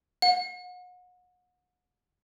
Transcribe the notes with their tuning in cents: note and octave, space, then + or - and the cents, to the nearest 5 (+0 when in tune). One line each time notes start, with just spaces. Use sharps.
F#5 -35